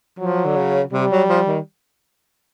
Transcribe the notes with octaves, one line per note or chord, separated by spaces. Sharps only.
F3 F#3
D3
C#3
C3 G3
F#3
F3
D#3